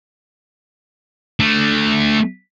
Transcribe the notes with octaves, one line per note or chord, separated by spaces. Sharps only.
A3 D4